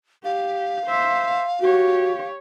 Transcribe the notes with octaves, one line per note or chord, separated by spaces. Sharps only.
G4 F5
C5 E5
F#4 G4 C#5